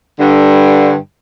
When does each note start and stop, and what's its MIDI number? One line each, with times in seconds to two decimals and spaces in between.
0.19 0.94 43
0.19 0.94 50